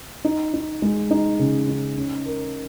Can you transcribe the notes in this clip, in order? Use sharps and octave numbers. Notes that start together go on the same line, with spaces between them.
D#4
D#4
G#3
D#4
C#3
D#4
C#4
A#4